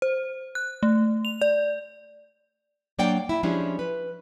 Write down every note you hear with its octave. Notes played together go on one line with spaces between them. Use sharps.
C5
F#6
A3
F7
D5
F#3 A#3 D4 D5 F#5 G5
E4
F3 G#3 C#4 D4 E4 G4
B4